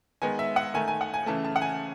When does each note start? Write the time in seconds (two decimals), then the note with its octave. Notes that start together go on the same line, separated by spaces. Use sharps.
0.22 D#3 G#3 B3 G#5
0.39 E5
0.56 F#5
0.74 D#3 A3 G#5
0.88 G#5
1.01 F#5
1.14 G#5
1.26 C#3 E3 A3 A5
1.44 A5
1.56 F#5
1.62 G#5